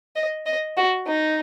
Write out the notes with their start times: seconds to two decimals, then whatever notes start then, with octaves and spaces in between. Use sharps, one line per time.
0.16 D#5
0.46 D#5
0.77 F#4
1.06 D#4